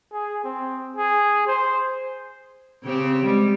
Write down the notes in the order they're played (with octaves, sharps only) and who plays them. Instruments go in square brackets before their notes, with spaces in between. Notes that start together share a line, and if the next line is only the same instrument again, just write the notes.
[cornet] G#4
C4
G#4
C5
[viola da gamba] C#3 C4 G4
G3 G#3